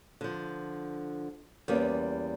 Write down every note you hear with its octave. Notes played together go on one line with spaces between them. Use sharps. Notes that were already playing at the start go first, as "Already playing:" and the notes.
D3 F3
E2 G3 A#3 C#4